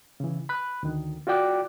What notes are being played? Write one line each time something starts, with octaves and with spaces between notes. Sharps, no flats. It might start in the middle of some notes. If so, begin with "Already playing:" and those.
C#3 E3
B5 F#6
D2 D#3
F4 F#4 D5 G5 D6 F#6